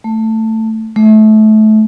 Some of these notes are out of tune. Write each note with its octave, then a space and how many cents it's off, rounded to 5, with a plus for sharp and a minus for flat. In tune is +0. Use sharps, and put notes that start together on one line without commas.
A3 +15
A3 -25